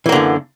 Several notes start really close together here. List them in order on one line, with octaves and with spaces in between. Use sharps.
E3 A#3 D3 F#2